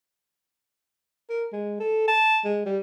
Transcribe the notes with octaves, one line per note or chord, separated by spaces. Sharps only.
A#4
G#3
A4
A5
G#3
G3